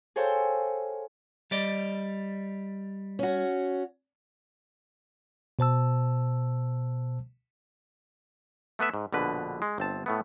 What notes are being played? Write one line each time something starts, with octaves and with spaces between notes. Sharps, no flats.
G#4 A4 C5 C#5 F5 G5
G3 D5 D#5
C#4 F#4
B2 C5 A5 E6
A3 B3 B4 E5
G#2
A#1 B2 D3 B4
G#3
G1 C4 A5
A2 A3 B3